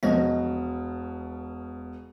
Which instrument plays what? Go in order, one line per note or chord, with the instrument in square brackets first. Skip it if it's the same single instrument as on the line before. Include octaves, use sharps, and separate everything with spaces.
[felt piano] E1 B2 [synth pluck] F3 G#3 D#5